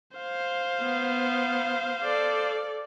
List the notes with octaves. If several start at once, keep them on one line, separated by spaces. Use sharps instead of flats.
C5 F5
B3
A4 D5